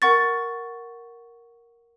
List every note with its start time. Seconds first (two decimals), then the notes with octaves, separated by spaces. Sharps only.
0.02 A#4 F#5 C#6 A6